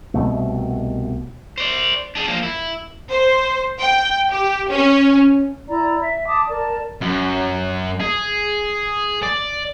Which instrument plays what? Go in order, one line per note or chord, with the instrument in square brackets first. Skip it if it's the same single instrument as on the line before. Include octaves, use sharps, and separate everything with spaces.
[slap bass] C2 B2 A3
[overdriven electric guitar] C5 D5
D4 G#4
F3 A#3
E4
[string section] C5
G5
G4
C#4
[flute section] E4 D5 A#5
E5
A5 D6 D#6
A#4 D5 A5
[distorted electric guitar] F#2
G#4
D5